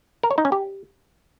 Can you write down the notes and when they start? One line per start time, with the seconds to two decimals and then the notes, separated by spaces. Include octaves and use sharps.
0.23 A#4
0.31 C#5
0.38 D#4
0.45 C#4
0.52 G4